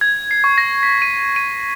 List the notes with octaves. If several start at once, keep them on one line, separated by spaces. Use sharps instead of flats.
G#6
C7
C#6
A#6
B6
D#7
D#7